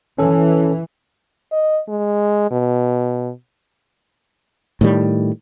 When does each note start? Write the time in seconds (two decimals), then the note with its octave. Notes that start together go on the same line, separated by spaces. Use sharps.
0.18 E3 C#4 A4
1.52 D#5
1.89 G#3
2.51 B2
4.81 A2 D#3 G3